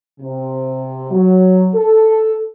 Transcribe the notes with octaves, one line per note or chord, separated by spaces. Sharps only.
C3
F#3
A4